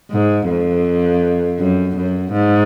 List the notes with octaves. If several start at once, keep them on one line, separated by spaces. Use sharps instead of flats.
G#2
F2
F#2
F#2
G#2